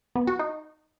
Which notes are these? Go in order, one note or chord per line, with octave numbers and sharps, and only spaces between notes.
B3
F#4
D#4